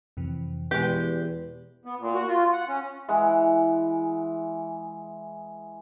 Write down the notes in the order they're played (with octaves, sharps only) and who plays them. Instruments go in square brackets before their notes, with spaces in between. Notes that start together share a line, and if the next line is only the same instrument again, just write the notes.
[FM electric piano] F2 C3 E3
[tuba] E2 [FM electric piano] B2 B4 [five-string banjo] G#3 G4
[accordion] B3
A#2
F#4
F4
F#5
C#4
[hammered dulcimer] E3 G#3 F#5